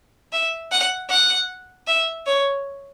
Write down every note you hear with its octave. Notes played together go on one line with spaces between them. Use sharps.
E5
F#5
F#5
E5
C#5